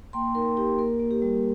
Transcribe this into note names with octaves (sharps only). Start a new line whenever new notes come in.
A#3 G5 C6
D#4 A#4
D#4 G4
A#3 A#4
A#3
G4
G3